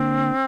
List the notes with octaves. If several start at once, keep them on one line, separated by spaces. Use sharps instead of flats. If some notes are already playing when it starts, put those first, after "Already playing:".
Already playing: D3 A#3 C4 D4